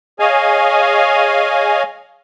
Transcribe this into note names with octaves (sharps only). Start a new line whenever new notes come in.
G#4 C#5 D#5 F5 G#5